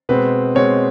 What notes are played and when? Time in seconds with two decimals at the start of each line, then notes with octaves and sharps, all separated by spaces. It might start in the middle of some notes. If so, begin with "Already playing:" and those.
0.09 B2 G#3 C4 B4
0.55 B2 G#3 C4 C#5